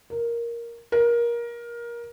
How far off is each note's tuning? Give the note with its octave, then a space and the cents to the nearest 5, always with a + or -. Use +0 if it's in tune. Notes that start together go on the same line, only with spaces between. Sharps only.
A#4 +5
A#4 +20